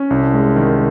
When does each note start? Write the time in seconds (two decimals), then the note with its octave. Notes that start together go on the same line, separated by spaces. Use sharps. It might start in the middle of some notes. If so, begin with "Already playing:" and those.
Already playing: C#4
0.10 C2
0.34 G#3
0.56 D#3